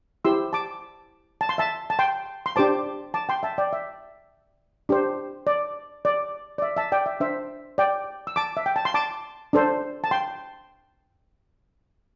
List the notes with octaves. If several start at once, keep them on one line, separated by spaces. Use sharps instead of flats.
E4 G4 C5 C6 E6
A5 D6
A5
C6
E5 A5
A5
G5 C6
C6
D4 G4 C5 A5 D6
A5 D6
G5 C6
E5 A5
D5 G5
E5
D4 G4 C5
D5
D5
D5
E5
E5 A5
D5 G5
E5
D4 C5 E5
D5 G5
E6
A5 D6
E5
G5
A5
C6
A5 D6
D4 A4 C5
A5
G5 C6